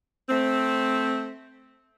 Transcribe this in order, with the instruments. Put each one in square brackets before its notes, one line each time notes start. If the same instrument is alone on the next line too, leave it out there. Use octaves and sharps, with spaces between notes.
[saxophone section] A3 C4